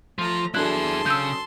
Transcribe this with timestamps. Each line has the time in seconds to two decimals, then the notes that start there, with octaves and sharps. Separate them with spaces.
0.19 F3 A3 A#5
0.55 F#3 D4 E4 G#4 A4 A5 C6 F#6
1.06 C#3 E6 G6